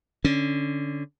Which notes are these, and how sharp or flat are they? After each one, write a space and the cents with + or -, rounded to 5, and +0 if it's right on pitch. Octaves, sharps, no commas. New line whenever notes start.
D3 +0 C#4 +5